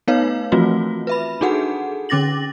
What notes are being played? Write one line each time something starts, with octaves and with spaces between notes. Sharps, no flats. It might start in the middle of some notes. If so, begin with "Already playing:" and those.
A3 B3 D#4 B4 C#5 F5
E3 F3 A3 C4 F4 F#4
B4 E5 B5
D4 D#4 F#4 G#4 A4 F#5
D3 C#4 D6 A6 A#6 F#7